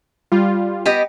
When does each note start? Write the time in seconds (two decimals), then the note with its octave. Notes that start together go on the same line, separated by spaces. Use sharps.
0.32 G3 F4
0.86 B3 G4 D#5